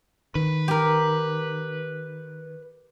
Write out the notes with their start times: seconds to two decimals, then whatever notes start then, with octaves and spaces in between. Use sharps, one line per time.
0.35 D#3 B4
0.68 G4 A#4